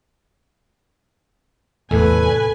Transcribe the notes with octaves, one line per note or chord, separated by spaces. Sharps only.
E2 A2 C3 A3 B4 G#5